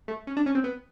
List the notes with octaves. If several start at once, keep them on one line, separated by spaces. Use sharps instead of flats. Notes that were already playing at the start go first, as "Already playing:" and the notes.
A3
C#4
D4
C#4
C4
B3